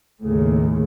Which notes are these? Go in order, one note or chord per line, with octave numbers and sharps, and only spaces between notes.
D#2 A2 C#3